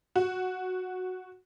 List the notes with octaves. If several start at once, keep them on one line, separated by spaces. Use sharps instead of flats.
F#4